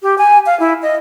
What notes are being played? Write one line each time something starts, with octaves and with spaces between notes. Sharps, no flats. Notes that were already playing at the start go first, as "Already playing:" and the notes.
G4
G#5
F5
E4
D#5